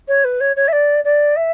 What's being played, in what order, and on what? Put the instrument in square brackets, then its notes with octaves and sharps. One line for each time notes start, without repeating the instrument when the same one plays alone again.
[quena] C#5
B4
C#5
C#5
E5
D5
D5
E5